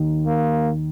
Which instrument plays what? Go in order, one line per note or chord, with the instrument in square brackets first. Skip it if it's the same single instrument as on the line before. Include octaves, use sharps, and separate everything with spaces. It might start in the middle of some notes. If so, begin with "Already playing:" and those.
Already playing: [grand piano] D#2 D#3
[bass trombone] A#3